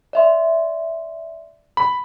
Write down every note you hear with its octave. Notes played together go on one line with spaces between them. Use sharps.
D5 E5 C6
B5